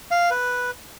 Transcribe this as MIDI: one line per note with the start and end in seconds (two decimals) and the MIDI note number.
0.11 0.30 77
0.31 0.71 71